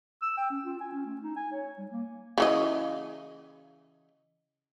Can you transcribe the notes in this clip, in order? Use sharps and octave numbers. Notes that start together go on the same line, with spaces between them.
E6
G5
C#4
F4
G#5
C#4
A3
D#4
G#5
C#5
G3
A#3
C#3 E3 D#5